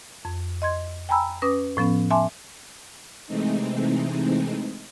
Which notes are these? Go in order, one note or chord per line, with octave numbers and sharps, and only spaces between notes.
F2
D#5 C6 G#6
G5 G#5 A#5 B5 E6
C#4 B4 D6 D#6 A#6
A2 F3 B3 C#4
E5 G#5 A5 C6 D6
C3 E3 G#3 A3 C4 D#4